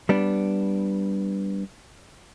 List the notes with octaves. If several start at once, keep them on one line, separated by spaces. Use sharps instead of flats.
G3 B3 D4